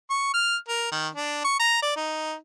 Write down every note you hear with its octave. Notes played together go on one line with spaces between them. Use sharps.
C#6
F6
A#4
D#3
D4
C#6
A#5
D5
D#4